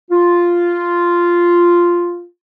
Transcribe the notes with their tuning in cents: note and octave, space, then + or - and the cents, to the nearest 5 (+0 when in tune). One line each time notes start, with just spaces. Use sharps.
F4 -5